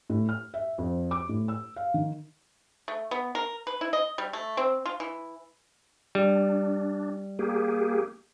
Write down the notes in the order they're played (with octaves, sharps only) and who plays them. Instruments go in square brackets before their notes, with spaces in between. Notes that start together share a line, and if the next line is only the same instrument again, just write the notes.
[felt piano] A2
F6
E5
F2
D6
A2
E6
F5
D#3
[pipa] A3
B3
A#4
B4
E4
D#5
G3
A3
C4
F4
E3
[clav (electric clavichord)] G3 [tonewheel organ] D4
[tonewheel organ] A#3 G4 G#4